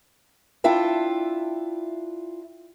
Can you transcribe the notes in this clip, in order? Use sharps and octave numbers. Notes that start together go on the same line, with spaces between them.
D4 E4 F4 E5 G5